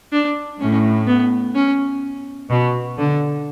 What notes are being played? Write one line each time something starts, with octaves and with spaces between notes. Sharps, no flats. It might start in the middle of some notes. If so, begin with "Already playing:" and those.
D4
A2 C#4
B3
C#4
B2
D3